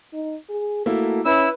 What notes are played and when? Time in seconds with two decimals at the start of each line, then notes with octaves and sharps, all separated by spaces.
0.13 D#4
0.50 G#4
0.86 A3 A#3 E4 F#4
1.25 C#4 E4 B4 E6